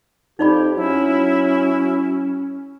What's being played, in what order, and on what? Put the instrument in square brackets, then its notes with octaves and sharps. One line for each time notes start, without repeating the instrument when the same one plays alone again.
[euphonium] F2 [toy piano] D#4 D5 B5 [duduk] G4
[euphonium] F#3 [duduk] C#4 [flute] E4